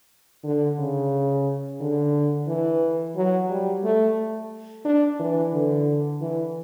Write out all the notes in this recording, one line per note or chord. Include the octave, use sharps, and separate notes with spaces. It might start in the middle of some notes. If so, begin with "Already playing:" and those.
D3
C#3
D3
E3
F#3
G3
A3
D4
E3
D3
E3